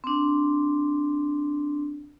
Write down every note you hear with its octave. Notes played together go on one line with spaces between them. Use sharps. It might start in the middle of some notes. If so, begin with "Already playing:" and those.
C4 D4